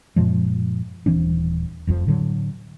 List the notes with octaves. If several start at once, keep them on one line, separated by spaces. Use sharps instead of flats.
F#2 A#2 F3 G#3
D#1 E3 C4 D4
F1 F2 G#2 F3
A2 D3 F#3